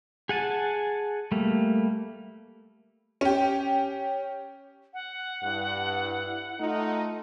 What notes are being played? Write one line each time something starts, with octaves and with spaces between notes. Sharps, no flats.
G#4 F#5 G#5 A5
G3 A3 A#3
C#4 G4
F#5
G2 E4
A3 D#4 F4